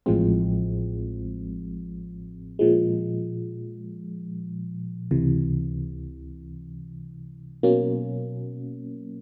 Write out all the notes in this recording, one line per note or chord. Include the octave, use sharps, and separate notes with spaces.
A1 A2 F3 G#3 C4
A#2 F3 G#3
C#2 C3 E3
B2 F#3 A#3 C#4